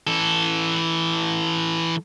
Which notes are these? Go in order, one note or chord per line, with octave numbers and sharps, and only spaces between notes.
E3 A4